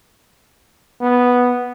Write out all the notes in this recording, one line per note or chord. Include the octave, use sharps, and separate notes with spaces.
B3